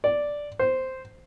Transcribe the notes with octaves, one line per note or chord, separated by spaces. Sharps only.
D5
C5